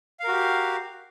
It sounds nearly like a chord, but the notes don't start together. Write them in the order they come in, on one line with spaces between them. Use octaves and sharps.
F5 A#4 F#4 G4